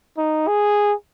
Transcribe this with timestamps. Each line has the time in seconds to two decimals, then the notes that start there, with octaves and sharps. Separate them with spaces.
0.18 D#4
0.47 G#4